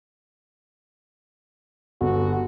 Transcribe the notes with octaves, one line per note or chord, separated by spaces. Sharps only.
G1 F#4